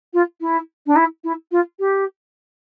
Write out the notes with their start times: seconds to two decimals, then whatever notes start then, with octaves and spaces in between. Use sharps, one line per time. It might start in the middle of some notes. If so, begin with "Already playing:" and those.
0.13 F4
0.41 E4
0.86 D4
0.96 E4
1.24 E4
1.51 F4
1.79 G4